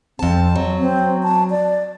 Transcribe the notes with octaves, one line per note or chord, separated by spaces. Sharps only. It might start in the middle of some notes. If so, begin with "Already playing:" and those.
F2 C4 A5
F#3
C4
A5
D5